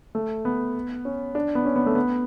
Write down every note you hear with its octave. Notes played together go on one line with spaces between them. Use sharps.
A3
B3
C#4
D4
B3
C#4
B3
A3
B3